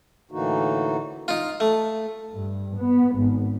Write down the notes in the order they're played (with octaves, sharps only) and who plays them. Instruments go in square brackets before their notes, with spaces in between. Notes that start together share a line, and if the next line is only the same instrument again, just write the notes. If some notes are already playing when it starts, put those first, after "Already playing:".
[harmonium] A2 D3 E3 A#3 D#4 F#4
[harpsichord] D#4 F4
A3
[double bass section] G2
B3
G#1